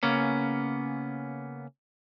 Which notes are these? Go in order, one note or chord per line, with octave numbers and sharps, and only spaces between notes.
C#3 A#3 B3 C#4